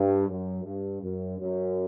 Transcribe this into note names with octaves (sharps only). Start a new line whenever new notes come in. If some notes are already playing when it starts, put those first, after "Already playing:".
Already playing: G2
F#2
G2
F#2
F#2